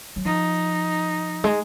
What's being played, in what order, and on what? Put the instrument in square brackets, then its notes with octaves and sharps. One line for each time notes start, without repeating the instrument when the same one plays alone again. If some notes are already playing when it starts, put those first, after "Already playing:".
[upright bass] F#3
[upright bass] F3 [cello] D#4
[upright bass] G#3